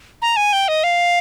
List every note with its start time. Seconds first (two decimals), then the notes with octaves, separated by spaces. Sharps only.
0.22 A#5
0.36 G#5
0.53 G5
0.68 D#5
0.84 F5